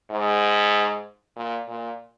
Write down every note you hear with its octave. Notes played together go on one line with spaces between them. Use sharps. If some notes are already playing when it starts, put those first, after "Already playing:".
G#2
A#2
A#2